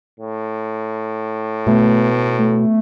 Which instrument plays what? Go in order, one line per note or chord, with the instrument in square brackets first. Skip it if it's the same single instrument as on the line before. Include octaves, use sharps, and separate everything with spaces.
[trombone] A2
[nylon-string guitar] B2 [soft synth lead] A3
[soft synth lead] A3